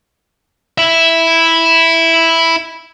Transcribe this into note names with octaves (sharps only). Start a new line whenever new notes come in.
E4 E5